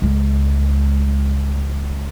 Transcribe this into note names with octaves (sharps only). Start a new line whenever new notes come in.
C#2 G#3